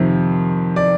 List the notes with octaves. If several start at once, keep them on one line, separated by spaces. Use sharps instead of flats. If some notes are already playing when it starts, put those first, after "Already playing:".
Already playing: F2 C3 D#3
D5